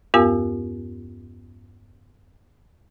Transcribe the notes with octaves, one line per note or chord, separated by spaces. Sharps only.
E2 G2 B3 F4 G4 A#4